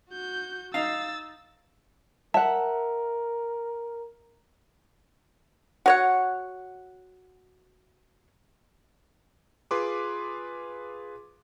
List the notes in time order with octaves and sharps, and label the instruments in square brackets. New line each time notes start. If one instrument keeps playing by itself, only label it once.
[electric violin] F#4 G6
[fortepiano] D#4 [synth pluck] F5 [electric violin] E6 A6
[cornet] A#4 [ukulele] E5 F#5 [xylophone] A5
[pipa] F#4 C#5 F#5
[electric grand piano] F4 G#4 B4 C6 D6